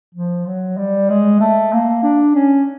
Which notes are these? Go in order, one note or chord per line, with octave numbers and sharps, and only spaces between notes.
F3
F#3
G3
G#3
A3
A#3
D4
C#4